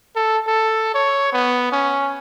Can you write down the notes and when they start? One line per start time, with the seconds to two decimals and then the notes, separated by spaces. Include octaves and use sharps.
0.16 A4
0.48 A4
0.95 C#5
1.33 B3
1.72 C#4